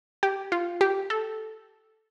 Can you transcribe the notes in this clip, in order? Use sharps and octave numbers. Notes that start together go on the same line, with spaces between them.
G4
F4
G4
A4